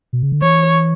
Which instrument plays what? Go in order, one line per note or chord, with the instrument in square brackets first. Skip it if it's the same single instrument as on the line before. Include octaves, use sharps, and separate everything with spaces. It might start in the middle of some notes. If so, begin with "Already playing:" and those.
[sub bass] B2
C#3
D3
[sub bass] E3 [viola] C#5